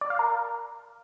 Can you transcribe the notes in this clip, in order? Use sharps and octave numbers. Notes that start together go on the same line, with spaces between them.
D5
F5
A#4